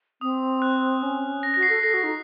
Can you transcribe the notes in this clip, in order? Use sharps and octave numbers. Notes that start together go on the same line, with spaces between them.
C4 D#6
F#6
C#4
A#6
F#4 A#6
C7
A4
A4 A#6
F#4
D#4